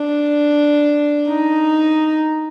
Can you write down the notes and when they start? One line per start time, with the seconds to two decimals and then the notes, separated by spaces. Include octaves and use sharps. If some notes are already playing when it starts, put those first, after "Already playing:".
Already playing: D4
1.28 D#4